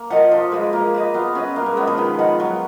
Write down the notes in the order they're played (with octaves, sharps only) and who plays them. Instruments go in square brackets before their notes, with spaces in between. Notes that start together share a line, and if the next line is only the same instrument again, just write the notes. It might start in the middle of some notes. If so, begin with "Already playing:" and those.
Already playing: [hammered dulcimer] A#3
[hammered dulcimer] F3 [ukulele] A#4 D#5 F#5
[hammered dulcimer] F3 [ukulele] F4
[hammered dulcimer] G#3 [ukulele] B4 D#5
[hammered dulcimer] A#3 [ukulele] F4
[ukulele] B4 D#5
[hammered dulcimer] B3 [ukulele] F4
[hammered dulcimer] C#4 [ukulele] B4 D#5
[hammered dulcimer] A#3 [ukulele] F4
[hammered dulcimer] G#3
[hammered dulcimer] B3 [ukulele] B4 D#5
[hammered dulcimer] F3
[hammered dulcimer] D#3 [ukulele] B4
[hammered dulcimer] F3 [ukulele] D#5 F#5 B5
[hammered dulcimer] F#3 [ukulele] B4